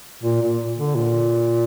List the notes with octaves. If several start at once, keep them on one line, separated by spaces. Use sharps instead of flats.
A#2
A#2
D3
A#2